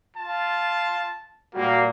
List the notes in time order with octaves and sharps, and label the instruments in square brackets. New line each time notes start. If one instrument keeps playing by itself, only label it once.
[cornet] F4 [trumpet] A5
[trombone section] A#2 F#4 [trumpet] G3 [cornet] A#3